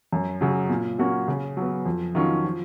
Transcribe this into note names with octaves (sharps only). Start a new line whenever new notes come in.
F#2
C#3 F#3
A#2
F#3 A#3 C#4 F#4
C#3
F#3 B3
F2
D#3 F#3 C#4 F4
F3